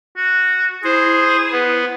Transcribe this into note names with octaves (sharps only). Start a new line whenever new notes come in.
F#4
E4 G#4 C5
B3